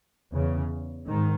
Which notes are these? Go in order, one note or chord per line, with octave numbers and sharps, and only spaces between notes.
E2 C#3
G#2 D#3